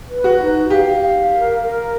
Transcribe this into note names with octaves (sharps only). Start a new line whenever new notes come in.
B4
F#4
D#4
G4 F5
F5
A#4
A#4